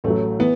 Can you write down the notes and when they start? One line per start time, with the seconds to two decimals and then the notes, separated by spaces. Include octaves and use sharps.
0.04 A1 A2 F#3 A3
0.39 E3 B3